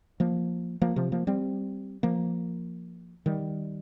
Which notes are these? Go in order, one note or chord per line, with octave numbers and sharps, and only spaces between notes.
F3 A#3
F3 A#3
C3 F3
F3 A#3
G3 C4
F3 A#3
D#3 G3